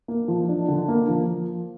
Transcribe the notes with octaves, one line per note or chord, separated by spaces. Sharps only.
A#3
F3
D4
D3
A#3
F3